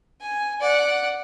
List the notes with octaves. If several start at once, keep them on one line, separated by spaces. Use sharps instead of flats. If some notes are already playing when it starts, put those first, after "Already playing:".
G#5
D5 F#5